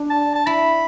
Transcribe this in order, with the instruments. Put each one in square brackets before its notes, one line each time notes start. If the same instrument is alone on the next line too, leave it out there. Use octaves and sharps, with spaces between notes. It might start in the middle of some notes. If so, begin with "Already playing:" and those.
Already playing: [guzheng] D4
[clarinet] A5
A5
[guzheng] E4 [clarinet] B5